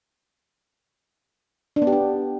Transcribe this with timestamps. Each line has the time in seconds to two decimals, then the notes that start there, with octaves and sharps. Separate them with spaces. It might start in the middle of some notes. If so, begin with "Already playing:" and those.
1.76 D4
1.82 B3
1.87 G4
1.92 D4